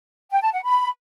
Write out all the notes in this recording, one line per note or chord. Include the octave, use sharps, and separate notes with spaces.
G5
A5
F#5
B5